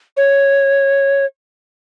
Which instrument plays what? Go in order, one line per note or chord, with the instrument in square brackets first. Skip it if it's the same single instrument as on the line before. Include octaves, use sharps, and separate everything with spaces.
[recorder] C#5